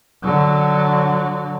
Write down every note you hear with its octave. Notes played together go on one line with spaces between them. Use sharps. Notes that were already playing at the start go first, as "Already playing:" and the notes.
D3 F#3